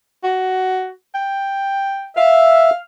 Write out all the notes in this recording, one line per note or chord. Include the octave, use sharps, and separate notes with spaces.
F#4
G5
E5 F5